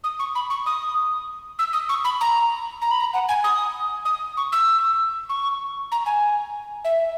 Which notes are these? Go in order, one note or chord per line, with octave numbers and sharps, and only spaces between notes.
D#6
C#6
B5
C#6
D#6
E6
D#6
C#6
B5
A#5
A#5
B5
A#5
F#5
G#5
D#6
D#6
C#6
E6
C#6
A#5
G#5
E5